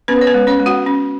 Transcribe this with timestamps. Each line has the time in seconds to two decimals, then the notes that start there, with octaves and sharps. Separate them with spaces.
0.08 B3 C#4 B4
0.21 C#5
0.27 B3 B4
0.34 G#3
0.47 C#4 C#5
0.60 G#3
0.66 F#4 F#5
0.87 C#4